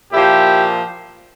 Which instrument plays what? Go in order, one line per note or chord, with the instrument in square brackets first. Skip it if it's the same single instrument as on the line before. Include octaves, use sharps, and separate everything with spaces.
[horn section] A#2 F3 E4 G4